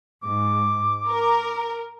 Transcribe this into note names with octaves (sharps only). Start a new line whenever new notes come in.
G#2 D6
A#4